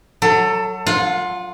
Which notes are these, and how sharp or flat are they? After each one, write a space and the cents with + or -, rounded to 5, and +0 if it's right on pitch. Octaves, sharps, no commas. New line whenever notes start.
F#3 +0 A4 +20
F4 +10 F#5 -30